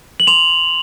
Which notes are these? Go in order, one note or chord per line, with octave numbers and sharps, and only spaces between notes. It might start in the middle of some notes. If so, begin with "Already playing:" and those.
F#7
C6 F7